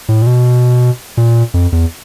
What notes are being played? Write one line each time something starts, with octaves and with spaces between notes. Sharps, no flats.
A2
A#2
B2
A#2
F2
E2